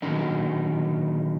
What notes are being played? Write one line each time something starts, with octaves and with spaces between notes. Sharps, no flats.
A#2 D3 D#3 F#3 C#4 D#4